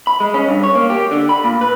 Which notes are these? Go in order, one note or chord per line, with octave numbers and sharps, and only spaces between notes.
B5
G#3
C#4
G2
C#5
A#3
G4
D3
B5
A#2
B4